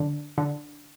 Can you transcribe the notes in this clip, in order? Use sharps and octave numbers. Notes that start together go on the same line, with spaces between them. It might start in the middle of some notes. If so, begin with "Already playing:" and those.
Already playing: D3
D3